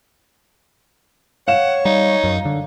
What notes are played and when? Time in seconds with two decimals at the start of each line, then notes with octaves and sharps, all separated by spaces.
1.48 C#5 F5 F#5 E7
1.85 G3 D#4
2.24 F#2
2.45 D3